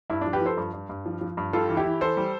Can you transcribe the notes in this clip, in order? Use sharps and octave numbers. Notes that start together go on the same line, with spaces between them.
G2 E4
F3 D4
G4 B4
F3 A4 C5
G2
G2
G2
F3
F3
G2
G3 F4 A4
E3
E4 G4
E3
E3 A4 C5
G3